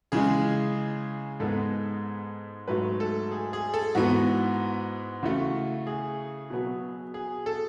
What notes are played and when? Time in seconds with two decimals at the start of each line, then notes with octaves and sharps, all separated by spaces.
0.12 C#3 E3 G#3 G#4
1.40 G#2 G#3 B3 A4
2.68 G#2 F#3 A3 B4
3.00 A4
3.31 G#4
3.53 G#4
3.74 A4
3.95 G#2 E3 B3 F#4
5.23 C#3 E3 A3 F#4
5.87 G#4
6.50 B2 F#3 B3
7.14 G#4
7.46 A4